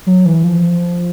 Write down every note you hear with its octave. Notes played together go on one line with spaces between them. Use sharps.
F#3
E3
F3